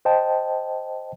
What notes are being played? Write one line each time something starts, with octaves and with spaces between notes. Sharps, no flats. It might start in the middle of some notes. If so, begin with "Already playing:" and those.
C5 D#5 G5 A5